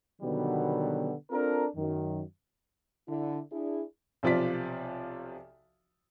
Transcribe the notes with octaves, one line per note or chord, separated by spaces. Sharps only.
B2 D3 D#3 F#3 G3 B3
C4 D4 F4 A4 A#4
F#2 D#3
D3 E4
D4 E4 G#4
B1 C3 F3 F4 D5 B6